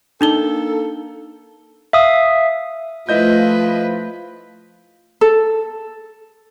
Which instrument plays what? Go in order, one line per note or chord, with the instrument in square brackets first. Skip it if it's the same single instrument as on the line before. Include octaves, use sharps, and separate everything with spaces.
[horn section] A#3 A4 [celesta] D4 D#4 G7
[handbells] E5 F5 D#6
[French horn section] F3 F4 [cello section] A3 [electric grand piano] E4 D#5 G6 [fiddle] B4
[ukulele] A4